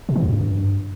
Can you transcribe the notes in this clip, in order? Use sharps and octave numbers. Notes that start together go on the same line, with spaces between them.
B2
D#3
E2
G2